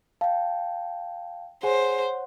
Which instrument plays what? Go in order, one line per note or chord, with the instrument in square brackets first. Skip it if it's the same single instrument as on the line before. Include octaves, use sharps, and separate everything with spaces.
[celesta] F5 [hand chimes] G5 A5
[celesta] G#4 G#5 [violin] C5 [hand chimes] C#5 F#5